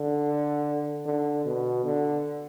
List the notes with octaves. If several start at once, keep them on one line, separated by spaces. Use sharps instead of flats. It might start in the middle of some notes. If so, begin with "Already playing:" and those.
Already playing: D3
D3
B2
D3